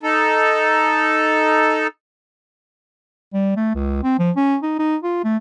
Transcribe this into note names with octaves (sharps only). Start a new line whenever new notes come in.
D#4 A4
G3
A3
C#2
C4
F3
C#4
D#4
D#4
F4
A3